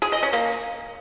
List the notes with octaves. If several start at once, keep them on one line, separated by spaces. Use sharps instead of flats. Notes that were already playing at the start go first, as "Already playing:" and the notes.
G#4
D#5
C#4
A#3